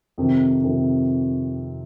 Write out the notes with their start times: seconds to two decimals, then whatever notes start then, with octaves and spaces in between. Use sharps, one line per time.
0.18 F2 C3 D#3
0.63 F2 C3 D#3